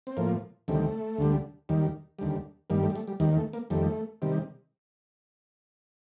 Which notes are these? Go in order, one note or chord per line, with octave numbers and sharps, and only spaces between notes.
C4
A2 F3 A#3
D2 C3 D#3 G3 A3
D2 D3 G3
D#2 D#3 G3
D#2 D3 G3
G2 D#3 G3 A#3
A3
G3
A3
G3
D#2 D#3 G3
A3
A#3
F2 D#3 G3 A3
C3 D#3 G3